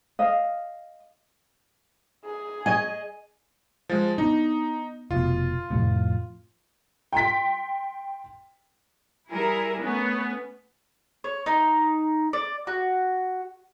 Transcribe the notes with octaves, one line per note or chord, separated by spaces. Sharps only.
D#5 F5
G#4
D#5 G#5
F3 G#3
B3 D4 D#4
F1 B2 F4
F2 A2 C3
G5 C6 B6
G3 E4 G#4 A#4
A3 B3 C#4
C#5
D#4
D5
F#4